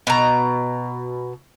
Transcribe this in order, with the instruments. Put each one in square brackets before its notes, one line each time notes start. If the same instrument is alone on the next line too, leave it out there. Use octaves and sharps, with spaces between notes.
[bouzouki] B2 A#5